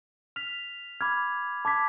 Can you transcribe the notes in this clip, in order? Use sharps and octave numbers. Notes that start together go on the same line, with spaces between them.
F6 B6 F7
B5 D6 F6 G#6
A5 D6 G#6 B6